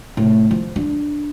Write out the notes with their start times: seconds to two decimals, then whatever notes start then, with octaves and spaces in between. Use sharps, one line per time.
0.17 A2 C3
0.51 F3
0.76 D4